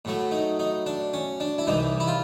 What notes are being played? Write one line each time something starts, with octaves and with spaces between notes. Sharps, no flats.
A2 F#3 A3
D#4
D#4
D4
C#4
D4
E4
C2 C3 E3 D#4
E4
F4